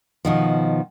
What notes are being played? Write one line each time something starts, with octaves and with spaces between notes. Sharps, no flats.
B2 D#3 F3